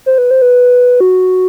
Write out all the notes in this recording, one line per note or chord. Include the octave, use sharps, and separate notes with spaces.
C5
B4
C5
B4
F#4